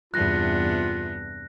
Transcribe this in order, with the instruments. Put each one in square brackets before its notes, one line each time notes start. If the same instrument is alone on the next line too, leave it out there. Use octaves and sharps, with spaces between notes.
[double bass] E2 G2 [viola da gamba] C3 B3 D4 [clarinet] F4 [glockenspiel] F#6 A#6